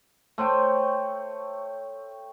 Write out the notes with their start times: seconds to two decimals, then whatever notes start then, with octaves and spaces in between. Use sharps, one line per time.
0.38 A3 C5 C#5 G5